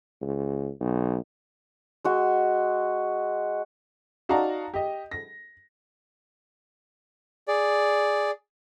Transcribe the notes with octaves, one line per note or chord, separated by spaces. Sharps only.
C#2
B1
G#3 F#4
D#4 F#4 D5 F5 A5 A#5
G4 D#5
A#6
G#4 D5